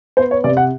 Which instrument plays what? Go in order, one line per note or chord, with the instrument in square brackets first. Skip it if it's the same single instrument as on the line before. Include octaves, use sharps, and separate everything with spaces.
[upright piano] B3 C5
C#5
C3 D5
F#5